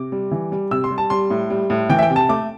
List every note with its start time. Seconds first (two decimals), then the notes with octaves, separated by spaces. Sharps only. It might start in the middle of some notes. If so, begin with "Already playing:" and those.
Already playing: C3 D6
0.12 G3
0.31 E3
0.52 G3
0.71 C3 E6
0.84 C6
0.91 G3
0.98 A5
1.10 G3 C6
1.30 A2
1.50 G3
1.70 A2
1.89 E3 G5
1.99 E5
2.03 G5
2.10 C3
2.16 A5
2.29 A3 D6